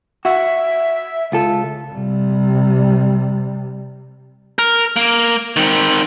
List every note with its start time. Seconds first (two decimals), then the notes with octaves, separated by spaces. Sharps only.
0.25 F#4 E5
1.32 C#2 F4 A4
1.93 C3 G3
4.59 A#4
4.96 A#3
5.56 D#3 C4